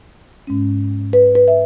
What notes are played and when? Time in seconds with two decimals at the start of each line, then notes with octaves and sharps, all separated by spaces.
0.47 G#2 G#3 C#4
1.13 B4
1.35 B4
1.48 E5